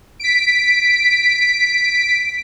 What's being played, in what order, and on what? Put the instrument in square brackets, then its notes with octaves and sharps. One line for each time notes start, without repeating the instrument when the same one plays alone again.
[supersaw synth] B6 D7